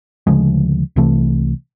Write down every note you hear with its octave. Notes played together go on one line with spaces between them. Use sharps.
D2 C#3 F3 G#3
C2 C3 E3 A3